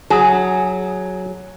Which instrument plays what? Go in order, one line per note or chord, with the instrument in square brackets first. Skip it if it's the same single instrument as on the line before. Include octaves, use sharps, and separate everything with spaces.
[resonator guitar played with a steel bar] F#3 [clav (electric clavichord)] G#4